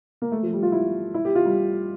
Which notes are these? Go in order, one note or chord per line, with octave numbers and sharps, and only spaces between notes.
A#3
A3
F3
G3
F4
E4
E4
G4
F4
G3